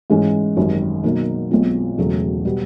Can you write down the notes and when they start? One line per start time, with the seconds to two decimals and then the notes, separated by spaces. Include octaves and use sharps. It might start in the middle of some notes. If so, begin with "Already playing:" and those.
0.10 G#2 E3 G#3 C#4
0.57 G#1 F#2 D#3 G3
1.03 B2 F#3 A#3 D#4
1.51 B1 B2 G#3 C4 F4
1.98 E1 E2 C#3 F#3 A3
2.45 B2 G3 B3